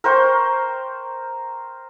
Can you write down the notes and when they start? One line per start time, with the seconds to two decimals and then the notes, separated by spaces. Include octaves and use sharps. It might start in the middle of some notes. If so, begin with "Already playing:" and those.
0.04 A#4 C5 G5 C#6